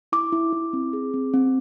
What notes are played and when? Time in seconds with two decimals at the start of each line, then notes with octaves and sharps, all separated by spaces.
0.12 E4 D6
0.32 E4
0.53 E4
0.73 C4
0.93 G#4
1.14 C4
1.34 C4